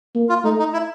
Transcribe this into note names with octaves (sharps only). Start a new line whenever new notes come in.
A#3
F4
A3 D#4
D#4
E4